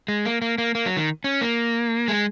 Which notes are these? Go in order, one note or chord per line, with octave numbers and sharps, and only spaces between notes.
G#3
A#3
A#3
A#3
A#3
F#3
D#3
C#4
A#3
G#3